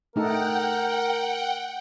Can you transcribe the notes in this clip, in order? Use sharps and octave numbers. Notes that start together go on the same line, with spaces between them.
A3 D#4 A4 A#4 F#5 G5